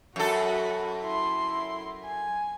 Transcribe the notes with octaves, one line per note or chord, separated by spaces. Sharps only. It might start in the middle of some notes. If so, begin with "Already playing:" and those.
F#2 F#4 A4 B5
E4 C6
G#5